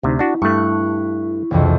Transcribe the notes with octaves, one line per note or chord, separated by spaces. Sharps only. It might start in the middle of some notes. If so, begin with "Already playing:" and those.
D2 C3 D#4
D4 E4 F#4
G2 A3 C#6 F#6
E1 C2 F2